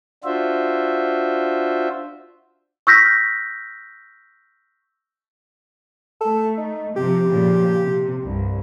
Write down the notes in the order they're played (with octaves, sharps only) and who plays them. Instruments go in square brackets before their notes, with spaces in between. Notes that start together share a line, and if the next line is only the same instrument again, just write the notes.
[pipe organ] D4 F4 F#4 C5 E5
[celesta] C#6 E6 F6 G6 A#6 B6
[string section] A3 [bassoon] A4
[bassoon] D#4
[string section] C3 F3 [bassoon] G4
[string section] A#2 C#3 F3
C3
C2 G2